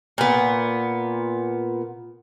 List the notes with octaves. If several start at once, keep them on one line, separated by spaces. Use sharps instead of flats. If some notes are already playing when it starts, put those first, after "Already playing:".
A#2 B3